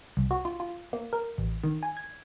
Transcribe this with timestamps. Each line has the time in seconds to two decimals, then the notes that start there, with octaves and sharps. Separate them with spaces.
0.17 C2
0.31 F#4
0.45 F4
0.60 F4
0.93 A#3
1.13 A#4
1.38 A1
1.64 D#3
1.83 G#5
1.97 G#6